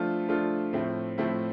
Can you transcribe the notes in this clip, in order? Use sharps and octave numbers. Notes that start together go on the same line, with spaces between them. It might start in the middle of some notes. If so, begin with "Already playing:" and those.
Already playing: F3 A3 D4 F4 A4
F3 A3 D4 F4 A4
A2 F3 A3 C4 E4
A2 F3 A3 C4 E4